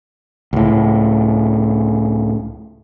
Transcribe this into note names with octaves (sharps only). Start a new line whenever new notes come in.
C#2 A2